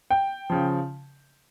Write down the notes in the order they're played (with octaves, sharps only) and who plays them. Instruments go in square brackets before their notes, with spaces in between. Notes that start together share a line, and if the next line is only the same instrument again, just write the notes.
[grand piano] G5
C#3 F3